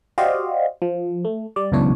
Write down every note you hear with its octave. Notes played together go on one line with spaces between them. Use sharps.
F#4 G4 C5 D5 D#5 F5
F3
A3
G3 D5
C#2 F#2 B2 E3 D4 C#5